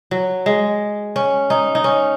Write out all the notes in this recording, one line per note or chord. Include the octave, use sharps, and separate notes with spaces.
F#3
G#3
C#4
D#4
D#4
C#4